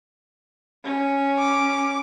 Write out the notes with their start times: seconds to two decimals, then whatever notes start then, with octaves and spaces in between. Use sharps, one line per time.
0.84 C#4
1.39 D6